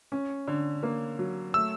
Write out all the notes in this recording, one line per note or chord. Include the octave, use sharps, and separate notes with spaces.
C#4
D3
A#3
F#3
A3 E6